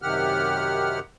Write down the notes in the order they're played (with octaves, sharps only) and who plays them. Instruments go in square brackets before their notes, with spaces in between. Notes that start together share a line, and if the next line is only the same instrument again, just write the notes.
[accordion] F#2 C3 D#3 G4 F#5 F6